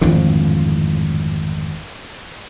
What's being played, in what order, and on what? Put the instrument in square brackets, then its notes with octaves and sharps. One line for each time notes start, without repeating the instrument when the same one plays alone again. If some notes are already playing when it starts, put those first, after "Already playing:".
[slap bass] G#1 F2 A2 D3